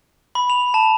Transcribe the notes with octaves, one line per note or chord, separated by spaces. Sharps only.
B5
F7
A5